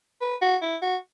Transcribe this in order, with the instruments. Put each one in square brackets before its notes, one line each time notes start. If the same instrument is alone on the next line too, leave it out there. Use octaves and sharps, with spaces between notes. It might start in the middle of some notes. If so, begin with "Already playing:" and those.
[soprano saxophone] B4
F#4
E4
F#4